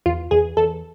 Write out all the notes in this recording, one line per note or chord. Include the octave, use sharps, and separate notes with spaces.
E2 F4
E2 G#4
E2 A4